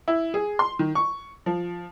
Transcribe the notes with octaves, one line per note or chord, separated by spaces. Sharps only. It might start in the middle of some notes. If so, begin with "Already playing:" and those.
E4
G#4
C6
D#3
C#6
F3